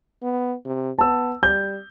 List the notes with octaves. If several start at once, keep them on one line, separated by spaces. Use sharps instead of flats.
B3
C3
B3 A5 E6
G3 G6